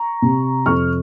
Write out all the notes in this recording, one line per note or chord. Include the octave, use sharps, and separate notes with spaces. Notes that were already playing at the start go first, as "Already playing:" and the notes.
Already playing: A#5 C#6
C3
F2 C#6 F6